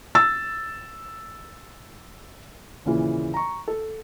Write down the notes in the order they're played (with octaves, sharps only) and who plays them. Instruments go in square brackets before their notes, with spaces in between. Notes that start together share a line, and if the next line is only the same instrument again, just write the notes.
[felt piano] E6 A6
D#2 A#2 C#3 E3
A#5 C#6
A4